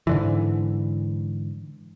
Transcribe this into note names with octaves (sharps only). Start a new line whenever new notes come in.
G#2 D3 E3